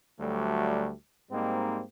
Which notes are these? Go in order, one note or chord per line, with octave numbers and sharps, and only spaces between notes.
D2 F#3 G3 A3
G#2 G3 A#3 C4 D#4